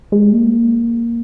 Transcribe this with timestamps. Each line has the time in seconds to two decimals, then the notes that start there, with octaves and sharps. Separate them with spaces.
0.12 G#3
0.32 A#3